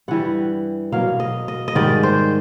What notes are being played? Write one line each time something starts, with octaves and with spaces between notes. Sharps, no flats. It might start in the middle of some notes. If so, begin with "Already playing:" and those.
G2 E3 G3 F#5
B2 F#3 A#3 F5
D#5
D#5
D#5
G#2 D#3 G3 D5
C5